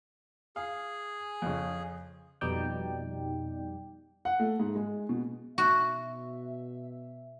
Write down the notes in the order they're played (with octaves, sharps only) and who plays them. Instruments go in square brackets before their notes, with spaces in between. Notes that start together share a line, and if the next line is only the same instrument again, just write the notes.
[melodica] G#4 [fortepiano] F5
[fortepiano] F2 C#3
[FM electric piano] F2 B2 G3 D#4 D5 G5
[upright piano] F#5
A3
G#2
G#3
B2
[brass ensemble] B2 E5 [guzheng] F#4